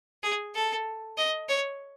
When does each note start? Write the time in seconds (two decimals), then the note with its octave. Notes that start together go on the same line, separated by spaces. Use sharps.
0.23 G#4
0.55 A4
1.18 D#5
1.49 C#5